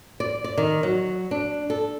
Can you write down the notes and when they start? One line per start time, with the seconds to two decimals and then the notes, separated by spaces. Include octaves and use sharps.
0.20 D5
0.44 D5
0.58 D#3
0.83 F#3
1.31 D4
1.70 A4